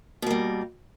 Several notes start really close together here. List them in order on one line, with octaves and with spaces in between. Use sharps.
B2 A#3 G3